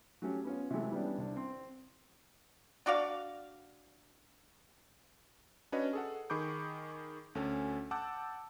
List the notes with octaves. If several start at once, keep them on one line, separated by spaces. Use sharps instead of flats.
F#3 A3 C#4 G4
B3 C#4 F4
C3 E3 F#3 G#3 A3
E3 G3 B3 C#4 D4
C2 D4
C4 C6
D4 F#4 D5 F5
C#4 D4 F#4 B4 C#5 D#5
G#4 A4 F#5
D#3 G#4 B5 C#6 D6 G6
D2 C#4 A4 G#5
F#5 A5 D6 E6 F#6 G6